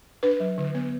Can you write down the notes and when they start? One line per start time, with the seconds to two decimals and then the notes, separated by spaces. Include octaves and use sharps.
0.23 D4 B4
0.40 F#3
0.58 D3
0.75 B3